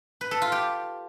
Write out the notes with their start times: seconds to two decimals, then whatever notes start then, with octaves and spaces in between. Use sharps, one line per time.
0.21 B4
0.31 A4
0.42 F4
0.52 G4